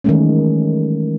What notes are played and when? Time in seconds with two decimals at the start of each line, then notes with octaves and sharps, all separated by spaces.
0.04 D#3 E3 F#3 G#3 A3 C#4